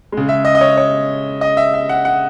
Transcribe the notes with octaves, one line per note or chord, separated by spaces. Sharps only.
C#3 G#3
E5
D#5
D#5
C#5
C#5
D#5
E5
E5
F#5
F#5